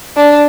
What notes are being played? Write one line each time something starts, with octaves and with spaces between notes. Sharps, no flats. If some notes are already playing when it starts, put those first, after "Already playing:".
D4